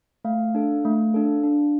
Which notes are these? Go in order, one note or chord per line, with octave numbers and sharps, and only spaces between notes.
A3 F5
D4 A4
A3
D4 A4
D4